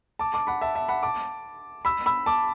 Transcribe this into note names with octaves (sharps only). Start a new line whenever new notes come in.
A5 D6
A5 D6
F#5 B5
E5 A5
E5 A5
F#5 B5
A5 D6
B5 E6
B5 E6
A5 D6